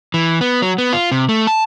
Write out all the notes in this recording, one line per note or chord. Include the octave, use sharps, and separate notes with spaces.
E3
B3
F#3
B3
F4
C3
A3
A5